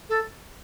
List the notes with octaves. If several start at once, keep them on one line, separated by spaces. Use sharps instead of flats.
A4